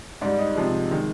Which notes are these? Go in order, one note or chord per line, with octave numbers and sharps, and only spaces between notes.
G#2 G3 D5
D#4 D#5
C3 F3 G#3
D#3 G#3